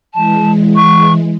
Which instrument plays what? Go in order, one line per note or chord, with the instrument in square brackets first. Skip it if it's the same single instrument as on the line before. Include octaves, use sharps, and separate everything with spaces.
[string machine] E3 G#3 [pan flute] A5
[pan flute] C#6